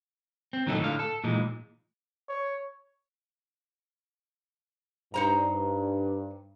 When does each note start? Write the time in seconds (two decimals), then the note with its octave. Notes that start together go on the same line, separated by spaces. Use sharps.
0.53 C4
0.67 A#2 D#3 F#3 A3 D#4 A4
0.80 A2 D3 F5
0.99 A4
1.24 A#2 E3 G#3 D#4
2.29 C#5
5.14 G2 D#4 C5 A#5